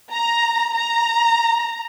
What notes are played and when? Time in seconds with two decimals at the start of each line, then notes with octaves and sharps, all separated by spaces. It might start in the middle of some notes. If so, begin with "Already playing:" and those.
0.12 A#5
0.75 A#5